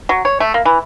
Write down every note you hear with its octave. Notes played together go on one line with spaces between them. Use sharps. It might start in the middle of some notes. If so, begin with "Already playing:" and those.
F#3
C#5
A3
A#3
E3